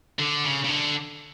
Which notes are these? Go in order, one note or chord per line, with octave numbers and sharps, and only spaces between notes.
D3
C#3
C#3
D3